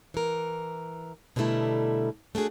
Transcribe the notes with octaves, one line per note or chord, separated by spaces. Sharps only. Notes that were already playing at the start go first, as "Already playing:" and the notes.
E3 A#4
B2 D3 G3 A3 E4 A#4
A3 D4 F#4 G#4